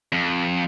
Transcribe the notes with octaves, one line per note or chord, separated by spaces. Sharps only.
F2